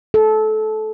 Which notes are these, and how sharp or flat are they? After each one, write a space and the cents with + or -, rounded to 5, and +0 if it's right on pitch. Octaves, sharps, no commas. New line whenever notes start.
A4 -20